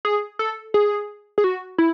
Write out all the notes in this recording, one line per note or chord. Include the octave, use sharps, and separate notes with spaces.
G#4
A4
G#4
G#4
F#4
E4